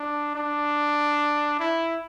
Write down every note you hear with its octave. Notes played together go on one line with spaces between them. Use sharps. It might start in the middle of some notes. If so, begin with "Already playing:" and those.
Already playing: D4
D4
E4